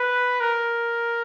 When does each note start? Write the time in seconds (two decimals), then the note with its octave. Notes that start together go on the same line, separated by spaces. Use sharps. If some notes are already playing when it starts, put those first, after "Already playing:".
Already playing: B4
0.41 A#4